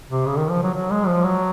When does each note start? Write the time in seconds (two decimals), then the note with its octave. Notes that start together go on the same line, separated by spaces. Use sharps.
0.10 C3
0.26 C#3
0.38 D#3
0.50 F3
0.63 F#3
0.75 F#3
0.91 G#3
1.07 F3
1.23 F#3